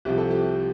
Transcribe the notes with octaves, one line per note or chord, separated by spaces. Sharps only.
C2 C3 F3 G4
A4
G4